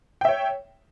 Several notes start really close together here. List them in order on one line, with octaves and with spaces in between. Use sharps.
G5 E5 C#5